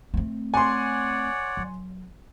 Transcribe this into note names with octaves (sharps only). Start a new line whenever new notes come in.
A3 C4
C#5 D5 F#5 G#5 C6
F#3